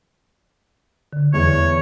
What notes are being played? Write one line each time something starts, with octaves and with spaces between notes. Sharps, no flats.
D3
E2 C#5